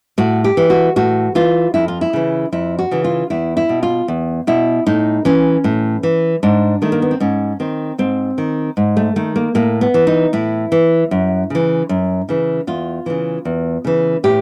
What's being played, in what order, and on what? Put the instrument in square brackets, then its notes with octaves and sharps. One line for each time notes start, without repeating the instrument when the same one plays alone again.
[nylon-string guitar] A2 F#4
G4
E3
F#4
A2 F#4
E3 F4
F2 E4
F4
E4
C#3 E3
F2 E4
F#4
C#3 E3
F4
E2 E4
E4
B2
F4
E2
B2 E4
A2 D#4
E3 C#4
A2
E3
G#2 D4
D#3 A3
A#3
B3
C4
G#2 C#4
D#3 C4
G#2 C4
D#3
G#2
A3
D#3 A3
A#3
A2 A#3
B3
E3
D#4
A2 E4
E3
F#2
C#3 E3
F#2
C#3 E3
E2 F4
C#3 E3
E2
C#3 E3
A2 G4